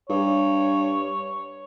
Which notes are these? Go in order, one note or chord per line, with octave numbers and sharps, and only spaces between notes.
G2 C#5